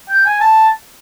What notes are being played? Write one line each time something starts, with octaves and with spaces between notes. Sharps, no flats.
G5
G#5
A5